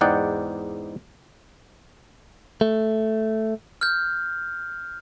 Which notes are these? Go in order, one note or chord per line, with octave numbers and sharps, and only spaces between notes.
E2 G#2 D#4 D5 F#5 G5
A3
F6 G6